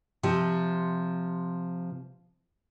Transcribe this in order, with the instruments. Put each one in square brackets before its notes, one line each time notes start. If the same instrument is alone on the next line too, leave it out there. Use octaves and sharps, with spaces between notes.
[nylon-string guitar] C3 F3 G4